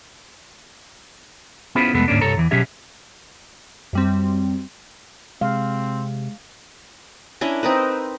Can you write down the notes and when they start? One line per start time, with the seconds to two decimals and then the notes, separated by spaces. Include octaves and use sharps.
1.75 B3 C#4 E4 F4 G#4 C5
1.93 C2 F2 G#3 A3 B3
2.08 D2 G#2 A#3 C#4 D4
2.21 C2 G2 A4 C#5 A#5
2.37 E2 E3
2.51 B2 F#3 C#4 G4 G#4 E5
3.93 F#2 G3 C4
5.41 C3 G#3 C4 F5
7.41 C#4 D4 E4 A#4
7.63 C4 D#4 A#4 B4